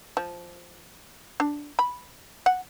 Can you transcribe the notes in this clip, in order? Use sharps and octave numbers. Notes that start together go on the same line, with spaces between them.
F3
D4
B5
F#5